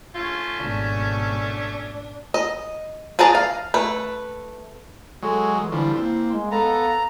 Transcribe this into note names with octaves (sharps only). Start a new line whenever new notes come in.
A3 C#4 F4
G#1 B2 D4
D#5
G#4 B4 D5 A5 A#5
F5
A3 B4
F#3 G#3 A4
E3
D3 F3 G3 E4
A#3 C4
G#3
B3 A4 F5 A#5